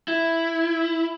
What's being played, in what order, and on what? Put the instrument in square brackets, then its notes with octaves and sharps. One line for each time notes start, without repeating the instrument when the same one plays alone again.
[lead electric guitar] E4